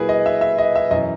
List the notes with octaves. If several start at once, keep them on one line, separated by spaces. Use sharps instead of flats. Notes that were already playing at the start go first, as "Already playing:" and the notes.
Already playing: A#2 F#3 E4 G#4 A#4 B4
D#5
E5
E5
D#5
E5
F#2 D#5
E3